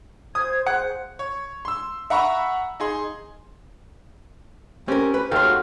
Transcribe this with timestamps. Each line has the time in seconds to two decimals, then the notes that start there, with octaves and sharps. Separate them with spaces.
0.35 C5 D#6 G#6
0.66 G#4 C5 F#5
1.19 C#5
1.65 C6 E6
2.10 E5 F#5 A#5 B5 C#6 E6
2.80 D#4 G#4 C6
4.88 C4 C#4 G4 A#4
5.14 B4
5.32 D#2 A4 F5 C6
5.45 F#4